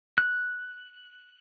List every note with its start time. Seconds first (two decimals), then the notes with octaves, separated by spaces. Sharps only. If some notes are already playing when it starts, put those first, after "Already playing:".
0.18 F#6